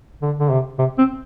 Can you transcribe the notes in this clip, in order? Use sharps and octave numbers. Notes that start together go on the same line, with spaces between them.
D3
D3
C3
C3
C4